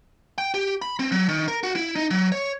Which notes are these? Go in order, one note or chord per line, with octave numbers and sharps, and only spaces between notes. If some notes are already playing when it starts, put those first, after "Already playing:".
G5
G4
B5
C4
F#3
D#3
A#4
F#4
E4
D#4
F#3
C#5